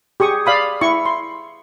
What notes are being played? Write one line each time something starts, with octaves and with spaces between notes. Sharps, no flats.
G4 G#4 C#6 D#6
D5 F5 B5 D#6
E4 C#6
C6